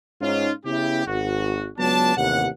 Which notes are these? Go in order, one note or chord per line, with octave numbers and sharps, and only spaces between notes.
G#2 C#4 D#4 F4
C#3 B3 E4 G4
G#1 F#4
C#2 F#3 B3 D4 A5
A1 D#2 C3 F#5